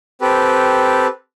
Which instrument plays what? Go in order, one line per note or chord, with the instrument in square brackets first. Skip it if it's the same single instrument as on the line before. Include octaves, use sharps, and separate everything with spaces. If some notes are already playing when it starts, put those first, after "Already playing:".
[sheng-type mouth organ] C4 G4 A4 B4